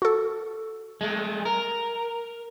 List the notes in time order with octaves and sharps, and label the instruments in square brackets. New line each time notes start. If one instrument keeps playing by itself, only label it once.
[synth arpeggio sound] F#4 A4
[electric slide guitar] G#3 A3
A#4